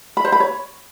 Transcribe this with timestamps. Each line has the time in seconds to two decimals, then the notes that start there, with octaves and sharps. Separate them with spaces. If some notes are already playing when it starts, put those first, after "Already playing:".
0.17 B5
0.25 C5
0.32 B5
0.40 C#5